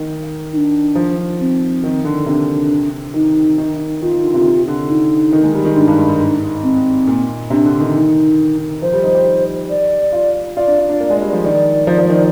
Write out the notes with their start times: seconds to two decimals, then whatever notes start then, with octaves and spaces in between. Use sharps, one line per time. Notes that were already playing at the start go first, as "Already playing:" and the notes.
Already playing: D#3
0.53 D#4
0.57 D4
0.95 F3
1.40 C4
1.84 D#3
2.05 D3
2.26 C3 D4
3.14 D#3 D#4
3.58 D#3
4.02 D#3 F4
4.13 D#3
4.24 D3
4.34 C3
4.45 C3
4.68 D3
4.89 D#4
5.33 D#3
5.38 A#3
5.44 G#3
5.55 G3
5.65 D#3
5.76 G#2 D4
5.88 G2
5.98 G#2
6.09 G#2
6.20 G#2
6.63 C4
7.07 A#2
7.50 C3 D4
7.65 D3
7.80 D#3
7.95 D#4
8.82 F3 C5
8.93 G3
9.03 D#4
9.15 G4
9.70 D5
10.13 F4
10.57 F4 D5
10.68 D4
10.78 F4
10.89 D4
11.00 A#3
11.10 G#3
11.22 G3
11.33 F3
11.44 D#3 D5
11.87 F3
11.99 F3
12.10 D#3